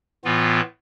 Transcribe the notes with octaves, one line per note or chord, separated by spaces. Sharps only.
A2 E3 B3 F4